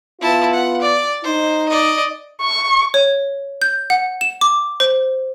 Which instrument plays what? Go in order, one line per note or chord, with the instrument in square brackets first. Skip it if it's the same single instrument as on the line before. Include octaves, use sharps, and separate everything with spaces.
[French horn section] B3 F4 [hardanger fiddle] E4 A5
[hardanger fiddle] F#5
D5
[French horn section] D#4 [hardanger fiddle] C5
[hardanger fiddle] D5 D#5
[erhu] C#6
[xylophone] C#5
G6
F#5
E7
D6
C5